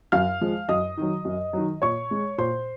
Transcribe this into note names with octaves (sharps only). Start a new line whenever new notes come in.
F#2 F5 F6
F3 G#3
F#2 D#5 D#6
D#3 F#3
F#2
D#3 F#3
A#2 C#5 C#6
G#3
A#2 C5 C6